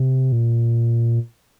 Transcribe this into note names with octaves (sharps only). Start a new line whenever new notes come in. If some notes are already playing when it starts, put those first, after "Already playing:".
Already playing: C3
A#2